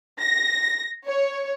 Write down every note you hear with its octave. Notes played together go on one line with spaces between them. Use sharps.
A#6
C#5